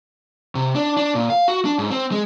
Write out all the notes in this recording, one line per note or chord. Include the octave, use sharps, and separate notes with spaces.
C3
D4
D4
A#2
F5
F#4
D4
G#2
C4
G#3